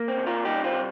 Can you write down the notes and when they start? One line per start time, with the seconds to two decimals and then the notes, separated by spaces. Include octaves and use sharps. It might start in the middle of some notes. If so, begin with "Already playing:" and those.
Already playing: A#3
0.08 C4
0.17 C3
0.26 F4 A#4
0.45 G3 D#4 G4
0.64 C4 F4
0.74 C3